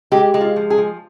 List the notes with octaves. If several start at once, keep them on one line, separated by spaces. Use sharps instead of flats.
G#3 G4
G#3
F4
F3
G#4
F3